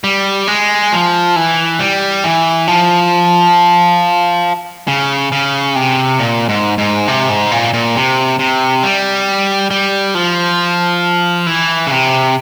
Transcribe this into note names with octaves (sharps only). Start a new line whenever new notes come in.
G3
G#3
F3
E3
G3
E3
F3
C#3
C#3
C3
A#2
G#2
G#2
C3
G#2
A#2
A#2
C3
C3
G3
G3
F3
E3
C#3
C3